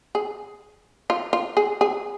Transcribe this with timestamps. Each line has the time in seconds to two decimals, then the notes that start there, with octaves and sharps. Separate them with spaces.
0.15 G#4
1.10 F4
1.33 F4
1.57 G#4
1.81 G#4